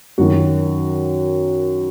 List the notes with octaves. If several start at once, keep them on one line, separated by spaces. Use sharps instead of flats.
F#2 D#3 F#4